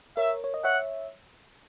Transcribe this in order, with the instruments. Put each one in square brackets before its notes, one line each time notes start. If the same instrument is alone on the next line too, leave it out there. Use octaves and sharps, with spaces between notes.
[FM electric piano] A#4 C#5 [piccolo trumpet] E5
[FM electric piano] C#5
D#5
[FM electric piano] C#5 E5 [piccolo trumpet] F#5